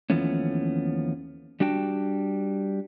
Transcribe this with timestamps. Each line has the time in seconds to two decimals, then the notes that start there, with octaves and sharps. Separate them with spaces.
0.10 D#2 E3 F3 A3 B3 C#4
1.60 G3 D4 F#4 G5 A5